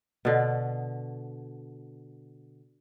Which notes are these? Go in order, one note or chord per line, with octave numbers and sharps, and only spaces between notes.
B2 D3